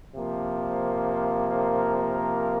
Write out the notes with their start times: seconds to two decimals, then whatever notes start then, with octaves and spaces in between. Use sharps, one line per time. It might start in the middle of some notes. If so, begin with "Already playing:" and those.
0.14 C3 F3 A#3
1.55 A#4